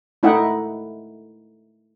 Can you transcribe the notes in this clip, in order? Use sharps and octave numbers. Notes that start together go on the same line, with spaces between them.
A3 D#4 E4 E5 F#5 G5